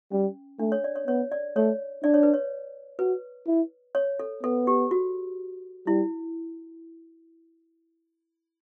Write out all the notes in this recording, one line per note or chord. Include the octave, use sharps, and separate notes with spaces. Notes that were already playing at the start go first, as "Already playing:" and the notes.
G3 C#4
A3 D4
C#5
D5
C#5
B3 C#5
D5
A3 C#5
D4 D5
C#5
B4
C#5
F#4 B4
E4
C#5
A4
B3 A4
G4
F#4
G3 E4